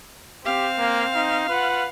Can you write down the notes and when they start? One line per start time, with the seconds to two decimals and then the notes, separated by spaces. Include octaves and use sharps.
0.46 C4 G4 F5
0.79 A#3
1.15 D#4
1.49 F4 B4 F#5